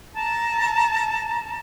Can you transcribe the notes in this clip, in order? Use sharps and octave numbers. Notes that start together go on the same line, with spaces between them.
A5 A#5